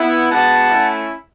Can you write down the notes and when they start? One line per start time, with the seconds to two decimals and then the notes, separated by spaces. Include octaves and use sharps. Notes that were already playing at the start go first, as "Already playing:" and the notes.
Already playing: B3 E4
0.30 G#3 B3 D4 F#4 F#5 A5
0.70 A3 C#4 E4